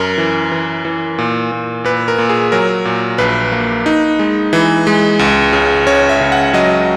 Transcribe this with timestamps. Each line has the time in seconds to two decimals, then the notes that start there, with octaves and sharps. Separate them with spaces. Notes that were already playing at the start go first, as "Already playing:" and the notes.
Already playing: F#2 A#4
0.18 E3
0.52 E3
0.85 E3
1.18 A#2
1.52 A#2
1.84 A#2 B4
2.08 A#4
2.18 A#2
2.29 G#4
2.52 F#3 A#4
2.85 A#2
3.18 A#1 B4
3.52 A#3
3.86 D#4
4.19 G#3
4.53 E3
4.87 G#3
5.19 C#2
5.53 C#3
5.87 C#2 C#5
6.09 E5
6.21 C#3
6.32 F#5
6.53 F#3 D#5